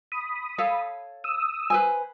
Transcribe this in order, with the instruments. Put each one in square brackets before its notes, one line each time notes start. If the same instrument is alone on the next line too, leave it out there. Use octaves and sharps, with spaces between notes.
[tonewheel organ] B5 D#6
[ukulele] A4 C#5 F5
[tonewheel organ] D#6 E6
[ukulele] B4 C5 G#5